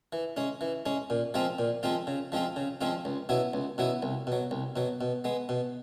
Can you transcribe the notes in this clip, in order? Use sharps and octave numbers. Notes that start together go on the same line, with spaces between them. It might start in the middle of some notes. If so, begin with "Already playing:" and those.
E3
G#3 C#4
E3
G#3 C#4
A#2
F3 G#3 C4 F4
A#2
F3 G#3 C4 F4
C#3
F3 G#3 C4 F4
C#3
F3 G#3 C4 F4
C#2
B2 F#3 B3 E4
C#2
B2 F#3 B3 E4
C2
B2 F#3
C2
B2 F#3
B2
G#3 B3
B2